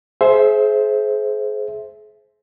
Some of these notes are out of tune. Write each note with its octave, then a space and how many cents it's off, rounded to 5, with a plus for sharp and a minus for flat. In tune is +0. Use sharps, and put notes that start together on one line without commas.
G#4 +35 C5 +0 E5 +0